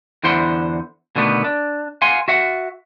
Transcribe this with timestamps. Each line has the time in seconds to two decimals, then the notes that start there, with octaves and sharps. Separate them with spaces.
0.24 E2 D3 E4 C5 F#5 C6
1.16 B2 D3 D#3 A3 B3
1.45 D4
2.02 F5 F#5 G#5 C6
2.28 F#4 E5 F#5